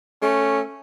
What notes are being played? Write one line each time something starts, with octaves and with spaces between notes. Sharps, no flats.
A3 C#4